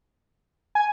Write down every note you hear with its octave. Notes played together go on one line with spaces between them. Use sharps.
G#5